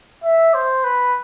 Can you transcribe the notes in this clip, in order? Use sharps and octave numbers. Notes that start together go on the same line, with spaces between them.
E5
C5
B4